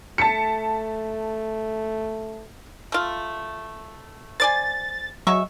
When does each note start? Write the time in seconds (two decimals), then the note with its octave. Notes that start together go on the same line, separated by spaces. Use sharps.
0.18 A3 A5 B6 C#7
2.92 A3 F4
4.40 C5 D5 G#5 A6
5.27 F#3 G#3 E5 C#6